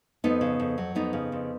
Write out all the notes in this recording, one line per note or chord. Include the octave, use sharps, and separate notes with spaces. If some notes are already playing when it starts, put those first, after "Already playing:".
F2 B3 D#4
C#3
F2
F#3
F2 B3 D#4
C#3
F2